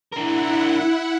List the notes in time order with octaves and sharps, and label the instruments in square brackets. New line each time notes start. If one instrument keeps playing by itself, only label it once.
[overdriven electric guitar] D4 A#4 [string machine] E4 F#5